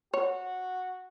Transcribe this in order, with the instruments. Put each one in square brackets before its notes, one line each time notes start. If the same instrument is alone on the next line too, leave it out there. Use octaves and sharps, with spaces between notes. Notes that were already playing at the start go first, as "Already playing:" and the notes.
[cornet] F#4 [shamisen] C#5